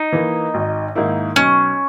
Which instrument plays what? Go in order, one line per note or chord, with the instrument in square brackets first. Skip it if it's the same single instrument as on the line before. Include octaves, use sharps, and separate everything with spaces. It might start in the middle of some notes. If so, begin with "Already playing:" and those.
Already playing: [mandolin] D#4
[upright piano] E3 A#3
G#1
G#2 D#3 A#3 E4
[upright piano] B1 [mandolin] C#4